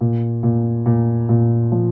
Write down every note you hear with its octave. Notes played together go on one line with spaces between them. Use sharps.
A#2
A#2
A#2
A#2
F3